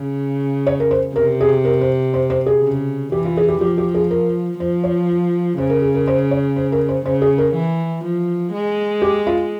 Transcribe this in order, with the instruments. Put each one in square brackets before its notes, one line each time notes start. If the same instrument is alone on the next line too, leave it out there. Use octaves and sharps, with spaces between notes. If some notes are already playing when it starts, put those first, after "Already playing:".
Already playing: [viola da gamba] C#3
[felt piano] C#5
A#4
C5
[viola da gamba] C3 [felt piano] A#4
[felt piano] G#4
A#4
C5
C5
C5
G#4
[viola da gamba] C#3
[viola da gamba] E3 [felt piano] G4
[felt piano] F4
G#4
G4
[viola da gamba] F3 [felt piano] G4
[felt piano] G4
G#4
A#4
[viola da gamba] F3 [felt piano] C5
[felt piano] C#5
[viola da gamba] C#3 [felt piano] C5
[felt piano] A#4
G#4
A#4
C5
C#5
C5
A#4
C5
[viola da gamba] C#3 [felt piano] C5
[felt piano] G#4
A#4
[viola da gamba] E3
F3
G#3
[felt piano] G4
F4